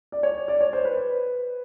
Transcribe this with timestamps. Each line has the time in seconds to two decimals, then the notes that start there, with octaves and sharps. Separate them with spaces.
0.12 D5
0.23 C#5
0.48 D5
0.61 C#5
0.73 C5
0.85 B4